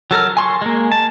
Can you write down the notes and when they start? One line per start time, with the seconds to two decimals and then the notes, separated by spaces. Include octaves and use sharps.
0.11 F#3 A4 A#4 F6
0.37 G#5 C6 C#6
0.62 G#3 A#3
0.92 A5